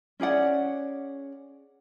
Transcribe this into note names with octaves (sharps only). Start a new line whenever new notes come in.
C#4 G#4 D5 F#5